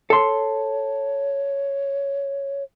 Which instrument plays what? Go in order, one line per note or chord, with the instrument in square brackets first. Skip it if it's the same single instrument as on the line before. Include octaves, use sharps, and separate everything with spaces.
[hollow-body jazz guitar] A4 C6 [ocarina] C#5